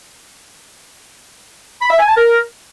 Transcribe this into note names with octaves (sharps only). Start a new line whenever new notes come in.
B5
E5
G#5
A5
A#4